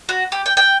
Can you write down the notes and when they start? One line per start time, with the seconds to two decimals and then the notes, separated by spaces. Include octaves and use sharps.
0.09 F#4
0.32 G4
0.46 G5
0.57 G5